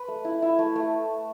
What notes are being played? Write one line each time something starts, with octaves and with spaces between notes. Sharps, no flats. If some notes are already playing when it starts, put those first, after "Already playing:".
Already playing: B4
A3
E4
E4
A3
A3